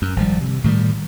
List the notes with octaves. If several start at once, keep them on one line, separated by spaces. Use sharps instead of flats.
F#2
G#1 F3 G3
C3
A2 D#3 F3 G3